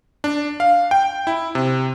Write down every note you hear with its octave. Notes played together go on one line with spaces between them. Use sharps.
D4
F5
G5
E4
C3